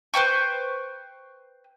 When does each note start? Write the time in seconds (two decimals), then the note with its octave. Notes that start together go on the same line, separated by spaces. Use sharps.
0.14 B4 C5 G5 C#6